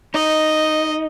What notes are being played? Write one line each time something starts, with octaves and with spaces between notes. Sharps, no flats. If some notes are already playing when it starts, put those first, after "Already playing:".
D#4 D#5